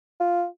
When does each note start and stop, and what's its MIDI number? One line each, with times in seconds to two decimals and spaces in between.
0.20 0.45 65